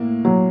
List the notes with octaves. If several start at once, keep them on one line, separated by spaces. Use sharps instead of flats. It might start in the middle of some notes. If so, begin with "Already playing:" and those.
Already playing: A2 A#3
F#3